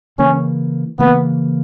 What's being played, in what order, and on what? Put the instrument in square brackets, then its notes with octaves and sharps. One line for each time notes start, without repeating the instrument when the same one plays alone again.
[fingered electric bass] C#3 E3 A#3 [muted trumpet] C#4
[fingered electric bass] C#3 E3 A#3 [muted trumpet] B3